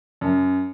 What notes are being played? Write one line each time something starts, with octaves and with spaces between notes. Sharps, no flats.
F#2